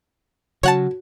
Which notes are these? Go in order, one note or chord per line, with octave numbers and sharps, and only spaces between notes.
C#3 F#3 F#4 C#5 F#5 A5